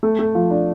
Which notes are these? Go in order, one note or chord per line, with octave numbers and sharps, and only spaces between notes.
A3
A3
F3
D4